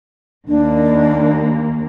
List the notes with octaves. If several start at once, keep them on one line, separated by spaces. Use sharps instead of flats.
D#2 A#3 D4